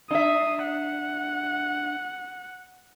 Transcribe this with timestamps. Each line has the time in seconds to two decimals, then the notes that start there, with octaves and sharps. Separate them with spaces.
0.11 D4 E5 D#6
0.63 F#5